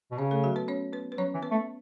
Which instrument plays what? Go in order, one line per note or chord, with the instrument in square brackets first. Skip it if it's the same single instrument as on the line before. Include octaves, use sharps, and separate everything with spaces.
[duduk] B2
[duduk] C#3 [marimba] C#4 C#5
[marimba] A3 A4
F#3 F#4
B3 B4
C#4 C#5
B3 B4
B4
[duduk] F#3 [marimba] C#4 C#5
[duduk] E3
[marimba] B3 B4
[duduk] A3